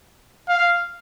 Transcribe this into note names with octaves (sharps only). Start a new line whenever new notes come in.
F5